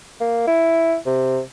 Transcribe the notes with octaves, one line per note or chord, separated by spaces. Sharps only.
A#3
E4
C3